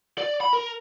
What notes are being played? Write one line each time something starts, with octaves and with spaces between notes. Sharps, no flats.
D5
B5
A#4